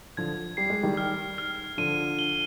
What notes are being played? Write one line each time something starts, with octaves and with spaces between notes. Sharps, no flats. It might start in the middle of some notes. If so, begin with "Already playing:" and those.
D3 F3 G#6
G3 C7
G#3
D#3 G3
F6
F6
D3 F3 D#7
G7